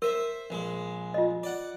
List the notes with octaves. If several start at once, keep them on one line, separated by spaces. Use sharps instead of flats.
A#4 C5 E5
A#1 G#3
F4 D#5
D5 F#5